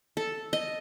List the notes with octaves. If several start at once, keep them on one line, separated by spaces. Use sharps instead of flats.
A4
D#5